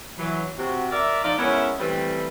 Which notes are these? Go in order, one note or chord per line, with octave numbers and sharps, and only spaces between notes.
E3 F#3
C3 F#4
A#4 D5 E5
F3 D#4 F4 D5
G#3 B3 C#4 E4 A#4 E5
E3 G3 A3 C4 B4